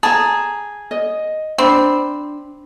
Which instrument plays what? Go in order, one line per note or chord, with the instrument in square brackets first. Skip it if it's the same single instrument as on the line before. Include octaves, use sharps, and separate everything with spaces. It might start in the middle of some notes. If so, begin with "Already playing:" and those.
[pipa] G#4 [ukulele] A5 A#5
[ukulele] D#5
[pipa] C4 [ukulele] D4 B5